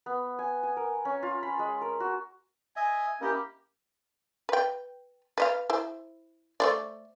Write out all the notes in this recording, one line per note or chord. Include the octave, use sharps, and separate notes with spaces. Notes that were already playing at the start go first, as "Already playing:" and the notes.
B3
G#5
G#5
A#4
C#4
F4
B5
G#3
A#4
F#4
D#5 E5 G#5
A#3 C#4 E4 G4 D#5
B4 G5
B4 D#5 F5
E4 C5
A3 C5 D5